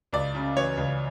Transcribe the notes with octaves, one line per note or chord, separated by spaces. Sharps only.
C#2 D5
C#3
E3 C#5
C#2